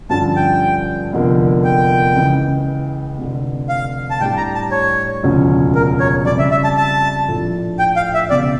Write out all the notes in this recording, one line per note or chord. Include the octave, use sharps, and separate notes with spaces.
G2 D3 F3 C#4 A5
G5
F1 E2 D3 F3 A#3
G5
C#2 C#3 E3
F1 F2 D3
F5
A5
A2 G3 D4 G4 G5
A#5
A5
C#5
E1 D2 C#3 F3 C#4
A#4
C#5
F2 C#3 G3 D5
E5
E5
A5
A5
A#1 A2 F3 A3 D4
G5
F5
E5
E1 E2 C#3 D5